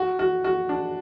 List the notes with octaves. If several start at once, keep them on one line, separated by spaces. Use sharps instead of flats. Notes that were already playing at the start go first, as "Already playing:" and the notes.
Already playing: F#4
F#4
F#4
D4